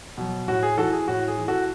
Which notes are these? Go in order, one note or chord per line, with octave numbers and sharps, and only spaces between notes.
B2 F#3
A2 F#4
G#4
E3 F#4 A4
G#4
A2 F#4
G#4
E3
F#4 A4